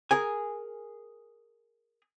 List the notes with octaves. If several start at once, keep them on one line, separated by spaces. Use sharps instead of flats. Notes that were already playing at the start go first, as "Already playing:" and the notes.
G#4 A#4 G#5